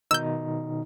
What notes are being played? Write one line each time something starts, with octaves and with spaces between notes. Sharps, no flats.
B2 D#3 D#4 E6 G6